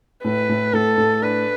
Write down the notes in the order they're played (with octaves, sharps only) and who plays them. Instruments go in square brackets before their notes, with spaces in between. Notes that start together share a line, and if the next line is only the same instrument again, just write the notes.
[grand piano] A2 [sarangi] B4
[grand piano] A2
[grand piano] A2 [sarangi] A4
[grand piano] A2
[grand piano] D4 [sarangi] B4